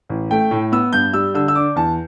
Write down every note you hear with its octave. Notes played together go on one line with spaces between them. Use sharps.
A1
A3 G5
A2
B3 E6
G2 G6
G3 E6
D3 E6
E6
D4 D6
E2 A5